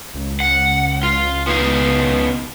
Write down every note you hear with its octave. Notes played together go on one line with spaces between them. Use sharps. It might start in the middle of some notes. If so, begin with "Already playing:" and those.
C#2
F#5
F4
B3 D#4 F5